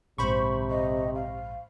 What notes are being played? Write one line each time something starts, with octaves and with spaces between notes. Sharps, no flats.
A#1 G#2 C3 C5 B5 C#6
D#5
F5